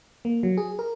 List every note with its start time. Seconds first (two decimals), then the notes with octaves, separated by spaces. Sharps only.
0.25 A#3
0.43 F#3
0.57 G#4
0.79 A#4